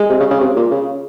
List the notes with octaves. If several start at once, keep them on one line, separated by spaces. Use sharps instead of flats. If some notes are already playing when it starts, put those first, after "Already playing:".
Already playing: G#3
C3
C#3
C#3
C3
A#2
C#3